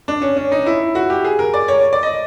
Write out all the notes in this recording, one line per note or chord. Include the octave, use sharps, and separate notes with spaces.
D4
C#4
C#4
D#4
E4
F#4
G4
G#4
A#4
D5
C#5
D5
D#5